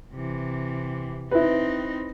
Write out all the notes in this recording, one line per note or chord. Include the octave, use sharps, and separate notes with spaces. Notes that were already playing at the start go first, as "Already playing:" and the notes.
C3 E3
C4 D#4 E4 B4